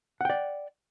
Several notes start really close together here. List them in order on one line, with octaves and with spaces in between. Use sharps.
F#5 G5 D5